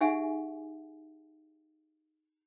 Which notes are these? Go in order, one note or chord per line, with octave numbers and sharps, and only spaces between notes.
D#4 G4 G#4 E5 F#5 G#5